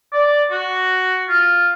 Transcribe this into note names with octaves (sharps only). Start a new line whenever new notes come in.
D5
F#4
F4